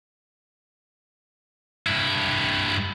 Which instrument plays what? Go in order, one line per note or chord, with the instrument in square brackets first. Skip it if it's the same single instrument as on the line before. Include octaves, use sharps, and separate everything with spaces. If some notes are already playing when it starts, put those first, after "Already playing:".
[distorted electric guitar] G2 E4